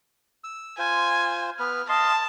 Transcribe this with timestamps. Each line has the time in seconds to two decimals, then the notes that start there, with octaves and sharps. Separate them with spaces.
0.44 E6
0.78 F4 C5 G#5
1.59 B3 B4 F6
1.89 D#5 F5 A5 C6